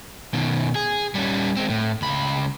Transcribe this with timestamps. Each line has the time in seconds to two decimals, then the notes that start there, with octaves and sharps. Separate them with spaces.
0.34 B2 D#3
0.75 G#4
1.15 G3 C#4
1.56 G#3 C4
1.70 A2
2.02 C#2 B5